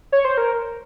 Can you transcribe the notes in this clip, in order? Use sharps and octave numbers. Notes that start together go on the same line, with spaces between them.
C#5
C5
A#4